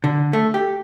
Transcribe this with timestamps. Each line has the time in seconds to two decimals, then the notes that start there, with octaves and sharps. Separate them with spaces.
0.04 D3
0.33 A3
0.54 G4